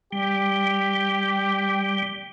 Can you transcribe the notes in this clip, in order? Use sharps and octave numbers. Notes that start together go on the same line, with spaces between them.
G3 G4